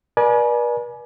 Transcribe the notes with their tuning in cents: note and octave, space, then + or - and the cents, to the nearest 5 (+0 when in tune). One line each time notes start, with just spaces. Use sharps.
B4 -45 D5 +20 G#5 +30